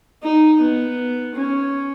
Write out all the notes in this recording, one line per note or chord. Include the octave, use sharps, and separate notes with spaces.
D#4
B3
C#4